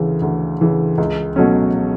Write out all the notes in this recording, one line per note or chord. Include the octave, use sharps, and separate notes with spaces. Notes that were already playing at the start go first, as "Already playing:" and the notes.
Already playing: D2 C#3 E3
D2
C#3 E3
C#2
B2 F#3 A3 C#4